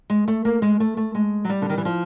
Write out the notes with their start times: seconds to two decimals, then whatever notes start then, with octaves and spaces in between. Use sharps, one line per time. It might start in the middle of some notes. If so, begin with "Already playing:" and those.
0.10 G#3
0.28 A3
0.45 A#3
0.62 G#3
0.80 A3
0.97 A3
1.15 G#3
1.45 F#3
1.49 G3
1.62 D3
1.70 D#3
1.78 E3
1.85 F3